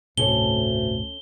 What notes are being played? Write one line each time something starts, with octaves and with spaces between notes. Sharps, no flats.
G1 D2 A2 C3 C#4 A4 C#5 G7